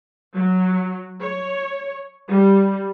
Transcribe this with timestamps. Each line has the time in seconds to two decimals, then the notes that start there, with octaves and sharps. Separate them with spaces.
0.33 F#3
1.20 C#5
2.28 G3